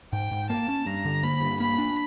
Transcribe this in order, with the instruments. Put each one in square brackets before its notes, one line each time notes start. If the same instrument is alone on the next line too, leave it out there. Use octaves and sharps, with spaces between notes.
[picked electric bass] G#2 [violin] G5
[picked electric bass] G#2
[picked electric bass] A#3 [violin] A5
[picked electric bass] C#4
[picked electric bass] G2 [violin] A#5
[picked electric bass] D3
[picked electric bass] A#3 [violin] B5
[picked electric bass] G2
[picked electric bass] A#3 [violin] B5
[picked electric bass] D4